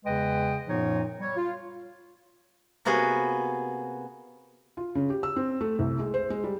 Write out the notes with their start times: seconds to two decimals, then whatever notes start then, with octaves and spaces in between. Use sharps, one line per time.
0.05 E2 C#3 G#3 B4 D#5 G5
0.68 F#2 A#2 F3 B3 D#4 C#5
1.20 G3 C#5
1.37 F4
2.85 C3 A#3 B3 F#4 G#4 B4
4.77 F4
4.95 C#3
5.10 G4
5.23 E6
5.36 C4
5.61 A3
5.79 C2
5.99 G#3
6.14 C5
6.30 G#3
6.44 G3